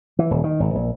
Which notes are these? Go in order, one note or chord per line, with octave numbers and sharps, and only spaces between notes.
E3
D#1
D#3
G#1
A#1